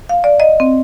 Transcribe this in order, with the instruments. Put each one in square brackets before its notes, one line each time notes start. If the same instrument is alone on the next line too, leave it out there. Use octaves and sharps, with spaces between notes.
[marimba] F5
D5
D#5
C4